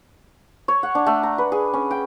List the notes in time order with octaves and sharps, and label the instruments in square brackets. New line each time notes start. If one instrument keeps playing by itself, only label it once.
[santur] C#5
F#5
D4
A3
A#5
B4
G#4
C#4
G5